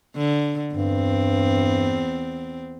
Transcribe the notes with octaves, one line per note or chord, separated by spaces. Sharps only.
D3
E2 G2 C4